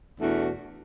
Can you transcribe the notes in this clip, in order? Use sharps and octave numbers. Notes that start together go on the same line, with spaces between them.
E2 B2 A3 D4 F#4